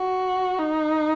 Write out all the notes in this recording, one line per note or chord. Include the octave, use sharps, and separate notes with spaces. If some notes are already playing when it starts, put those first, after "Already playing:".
Already playing: F#4
D#4